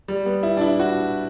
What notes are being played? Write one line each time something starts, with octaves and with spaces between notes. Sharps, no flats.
G3
B3
E4
D4
E4
F#4